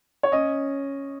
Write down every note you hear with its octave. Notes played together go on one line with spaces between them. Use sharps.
C#5
C#4 D#5